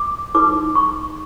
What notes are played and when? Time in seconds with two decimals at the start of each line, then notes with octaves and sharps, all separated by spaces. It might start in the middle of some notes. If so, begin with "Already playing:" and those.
Already playing: D6
0.34 D#4 G#4 B4 D6
0.75 C#6